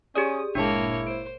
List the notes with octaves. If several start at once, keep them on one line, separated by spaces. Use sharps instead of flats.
C#4 G4 G#4 D5 D#6
G1 A#2 G#3 A#3 D4 E4 C#5 A5
C5 D7